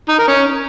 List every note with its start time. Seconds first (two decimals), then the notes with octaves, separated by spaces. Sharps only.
0.09 D#4
0.19 A#4
0.28 C#4